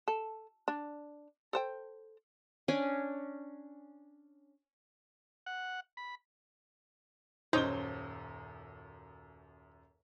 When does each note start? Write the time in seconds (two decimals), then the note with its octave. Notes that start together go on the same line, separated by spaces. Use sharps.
0.08 A4
0.68 D4
1.53 A4 C5 G5
2.68 C#4 D4 G#5
5.46 F#5
5.97 B5
7.53 D#1 F#2 D#4 C5 C#5 G7